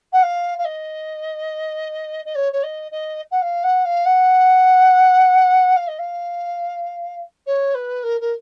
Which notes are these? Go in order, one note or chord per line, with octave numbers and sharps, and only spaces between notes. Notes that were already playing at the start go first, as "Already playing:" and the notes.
F#5
F5
F5
D#5
D#5
C#5
C#5
D#5
D#5
F#5
F5
F#5
F5
F#5
F5
D#5
F5
C#5
B4
A#4
A#4